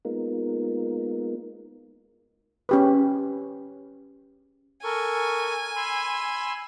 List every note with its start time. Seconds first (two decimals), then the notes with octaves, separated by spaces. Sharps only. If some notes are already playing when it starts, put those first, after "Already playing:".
0.05 G#3 A#3 B3 D#4 F4 A#4
2.69 C#4 G4 B4
4.84 A4 A#4 G#5 C#6
5.76 B5 C6 E6